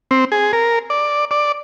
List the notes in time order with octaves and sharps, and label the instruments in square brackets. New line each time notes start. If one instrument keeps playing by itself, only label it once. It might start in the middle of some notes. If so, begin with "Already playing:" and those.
[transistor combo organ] C4
G#4
A#4
D5
D5